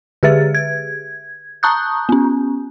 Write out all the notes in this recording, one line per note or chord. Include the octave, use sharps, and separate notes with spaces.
D3 G4 G#4 B4 E5 A6
G#6
A5 A#5 C#6 D#6 F#6 G6
B3 C#4